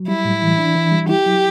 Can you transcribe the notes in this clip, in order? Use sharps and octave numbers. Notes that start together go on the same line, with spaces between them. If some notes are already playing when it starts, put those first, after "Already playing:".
Already playing: F#3
G3 E4
A2
E3
D4
E3
G3
E4 G4
F#3